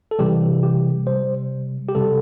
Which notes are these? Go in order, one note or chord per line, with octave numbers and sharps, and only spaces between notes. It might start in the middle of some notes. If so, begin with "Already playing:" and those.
A4
C3 E3 G3 G4
G4
C3 G3 C5
G4
C3 G3 A4